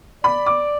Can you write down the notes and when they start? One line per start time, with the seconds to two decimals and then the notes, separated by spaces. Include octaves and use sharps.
0.24 D5 B5
0.46 D6